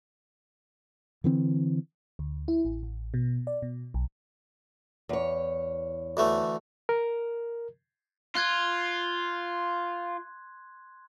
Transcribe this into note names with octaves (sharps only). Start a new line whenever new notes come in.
D3 E3 C4
D2
E4
A1
A1
B2
D5
B2
B1
E2 C#5
D2 E3 A3
A#4
F4 C6 F#6 G#6